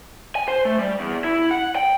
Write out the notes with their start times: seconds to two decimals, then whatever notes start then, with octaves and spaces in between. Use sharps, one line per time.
0.36 G#5
0.48 C5
0.65 A3
0.79 G3
1.00 E2
1.24 E4
1.51 F#5
1.75 G5